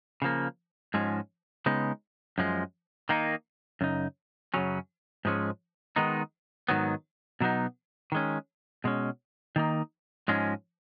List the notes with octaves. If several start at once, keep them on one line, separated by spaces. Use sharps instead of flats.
C#3 F3 A#3
G#2 F3 G#3 C#4
C#3 G#3 B3 D#4
F#2 F3 G#3
D#3 A#3 D#4
F#2 C#3 D#4
F#2 C#3 F#3 C#4
G#2 F3 G#3 C#4
D#3 G#3 B3 D#4
G#2 D#3 F#3 B3
B2 F#3 B3 D#4
D#3 G#3 C#4
B2 G#3 C#4
D#3 A#3 D#4
G#2 F3 G#3 C#4